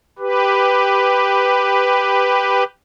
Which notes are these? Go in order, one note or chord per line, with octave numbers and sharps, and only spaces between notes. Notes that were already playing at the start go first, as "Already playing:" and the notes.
G4 B4